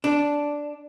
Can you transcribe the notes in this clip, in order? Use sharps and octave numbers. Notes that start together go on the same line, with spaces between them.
D4